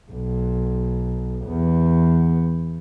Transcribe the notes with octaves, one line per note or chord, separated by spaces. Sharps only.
B1
E2 B3